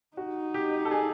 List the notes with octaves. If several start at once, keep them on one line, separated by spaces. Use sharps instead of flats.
D#4 F#4
G4
A4
G#4